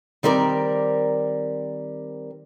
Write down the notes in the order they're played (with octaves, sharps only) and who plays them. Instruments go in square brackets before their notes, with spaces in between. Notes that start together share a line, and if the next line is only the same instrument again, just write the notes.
[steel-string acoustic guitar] D#3 G3 C4 A#4 D5